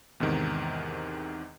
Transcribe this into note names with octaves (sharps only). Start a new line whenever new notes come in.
E2 G#2 C3 D#3